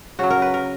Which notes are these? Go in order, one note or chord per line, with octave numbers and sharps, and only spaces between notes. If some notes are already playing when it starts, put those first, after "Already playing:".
C#3 F#3 F#4
A#4
B4
A#4